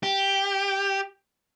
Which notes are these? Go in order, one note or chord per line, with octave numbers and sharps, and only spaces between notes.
G4